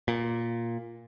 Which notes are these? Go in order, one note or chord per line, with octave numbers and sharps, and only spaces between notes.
A#2